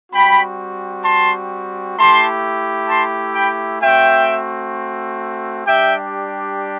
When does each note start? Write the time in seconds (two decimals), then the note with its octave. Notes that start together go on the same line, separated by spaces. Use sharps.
0.11 G3 C4 F#4 G5 B5
1.04 A5 C6
1.96 A3 E4 G4 A5 C6
2.88 A5 C6
3.35 G5 B5
3.81 A3 C4 F#4 E5 G5
5.66 G3 D4 G4 E5 G5